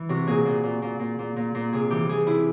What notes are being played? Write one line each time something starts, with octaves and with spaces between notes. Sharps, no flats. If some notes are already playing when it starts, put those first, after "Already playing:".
Already playing: E3
C3 F#4
A#2 G#4
A#2
A#2
A#2
A#2
A#2
A#2
A#2
C3 G#4
E3 G4
E3 G#4
C3 E4